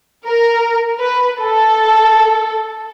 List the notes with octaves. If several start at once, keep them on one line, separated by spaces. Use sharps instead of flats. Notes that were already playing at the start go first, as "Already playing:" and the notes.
A#4
B4
A4